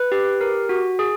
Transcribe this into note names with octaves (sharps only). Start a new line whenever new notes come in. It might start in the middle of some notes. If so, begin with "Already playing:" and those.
Already playing: B4
G4
A#4
F#4
G#4